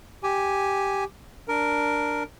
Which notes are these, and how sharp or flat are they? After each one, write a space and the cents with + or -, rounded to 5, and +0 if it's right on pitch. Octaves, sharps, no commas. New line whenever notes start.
G4 +0 G#5 +0
D4 +0 A#4 +0